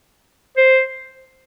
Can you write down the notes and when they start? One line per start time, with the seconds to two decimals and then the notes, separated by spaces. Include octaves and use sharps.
0.57 C5